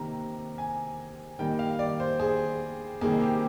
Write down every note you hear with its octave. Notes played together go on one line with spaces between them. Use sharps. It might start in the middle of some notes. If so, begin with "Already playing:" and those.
Already playing: C3 D#3 A#3 A#5
G#5
D#3 G3 A#3 G5
F5
D5
C5
G#4
C3 D#3 G3 A#3 G#4
G4